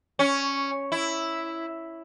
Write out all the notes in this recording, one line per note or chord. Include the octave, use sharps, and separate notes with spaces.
C#4
E4